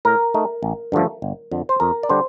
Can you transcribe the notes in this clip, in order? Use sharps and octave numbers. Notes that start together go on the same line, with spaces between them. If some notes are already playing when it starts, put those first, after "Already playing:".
A2 A#4
A3 D#4
A1
G2 D3 F3 A3
G1
F2 D3
C5
F2 A#4
D5
D3 G3 D4 C5